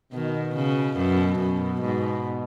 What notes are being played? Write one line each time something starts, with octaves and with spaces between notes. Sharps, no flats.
B2 D#3
C#3
F#2
F#2
G#2